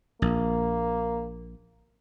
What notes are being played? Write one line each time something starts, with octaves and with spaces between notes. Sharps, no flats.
A#1 A#3